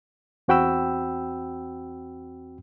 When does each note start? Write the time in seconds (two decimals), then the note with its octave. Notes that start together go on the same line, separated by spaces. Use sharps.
0.48 E2 C4 F#4 G5 B5 E6